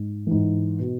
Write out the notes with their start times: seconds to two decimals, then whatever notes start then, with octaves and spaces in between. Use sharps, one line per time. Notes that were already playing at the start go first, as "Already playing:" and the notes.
Already playing: G#2
0.27 G#2 E3
0.79 B2